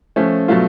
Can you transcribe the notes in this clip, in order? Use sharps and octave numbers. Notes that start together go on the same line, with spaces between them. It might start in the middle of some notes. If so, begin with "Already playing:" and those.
F3 A3 C#4
B2 F#3 A3 F4